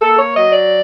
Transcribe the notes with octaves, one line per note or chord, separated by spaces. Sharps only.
A#3 A4
C#5
F#3 D#5
D5